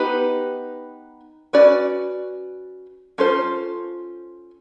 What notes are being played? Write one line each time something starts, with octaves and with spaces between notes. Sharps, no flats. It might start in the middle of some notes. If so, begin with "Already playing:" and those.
Already playing: B3 D#4 G4 B4
C#4 F#4 B4 D5
C#4 F4 A4 C5